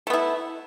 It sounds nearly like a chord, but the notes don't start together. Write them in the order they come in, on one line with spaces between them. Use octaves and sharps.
A3 B3 E4